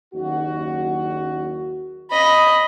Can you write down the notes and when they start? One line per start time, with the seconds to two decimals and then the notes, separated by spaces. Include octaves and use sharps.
0.13 F#1 D#2 F#4
2.10 D#5 B5